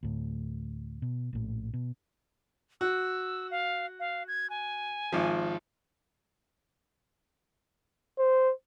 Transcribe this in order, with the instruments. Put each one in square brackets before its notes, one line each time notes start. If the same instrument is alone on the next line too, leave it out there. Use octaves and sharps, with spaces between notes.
[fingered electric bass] D2 A2
B2
A#1 A2
B2
[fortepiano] F#4 [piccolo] E6
[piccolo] F5
F5
G#6
G#5
[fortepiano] G#1 F3
[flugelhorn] C5